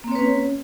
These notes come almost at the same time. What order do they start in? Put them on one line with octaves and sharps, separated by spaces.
A#3 C4 C#5 B4 C#4